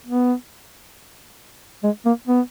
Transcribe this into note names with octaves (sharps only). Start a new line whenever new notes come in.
B3
G#3
A#3
B3